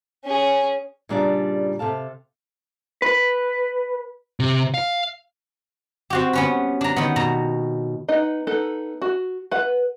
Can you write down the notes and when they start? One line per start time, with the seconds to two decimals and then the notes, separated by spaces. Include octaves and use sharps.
0.24 C#4 G#4
1.09 A#2 C#3 G3 D4 G#4 D5
1.79 C3 A4 F5 A5
3.02 B4
4.40 C3
4.74 F5
6.10 C4 F#4 G4
6.33 B3 C#4 B4
6.81 D4 A#5
6.96 D#3 B3
7.16 B2 A#5
8.08 B3 D#4 D#5
8.47 B3 D#4 A4
9.02 F#4
9.51 B4 F#5